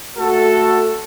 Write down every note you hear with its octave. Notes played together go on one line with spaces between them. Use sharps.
A3 F#4 A4